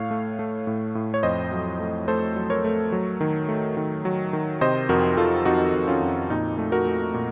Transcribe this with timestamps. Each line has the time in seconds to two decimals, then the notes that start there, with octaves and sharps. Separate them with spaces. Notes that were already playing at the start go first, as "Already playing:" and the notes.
Already playing: A2 A3 C#5 F5
0.11 A3
0.39 A3
0.67 A2
0.95 A2
1.14 C#5
1.23 F2 C5 D#5
1.52 F#3
1.80 A3
2.08 A3 A4 C5
2.36 F#3
2.50 A#4 C#5
2.64 A3
2.92 F#3
3.21 D#3
3.49 A3
3.77 D#3
4.05 F#3
4.33 D#3
4.61 C3 C5 D#5
4.89 F2 F#4 A#4
5.17 F2 F4 A4
5.45 F2 D#4 F#4
5.74 F2
5.88 C#4 F4
6.02 F2
6.30 A#2 D#4
6.58 A3
6.72 F#4 A#4
6.86 A3
7.14 A#2